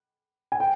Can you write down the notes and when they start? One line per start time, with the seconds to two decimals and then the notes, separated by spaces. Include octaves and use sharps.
0.52 G#5
0.60 G5